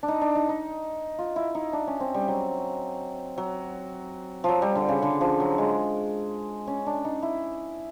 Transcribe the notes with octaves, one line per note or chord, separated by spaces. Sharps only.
D4
D#4
D4
D#4
D#4
F4
E4
D#4
D4
C#4
C4
G3
F#3
F#3
F3 F#3
G3
D3
C#3
D3
F3
F#3
G#3
C#4
D4
D#4
E4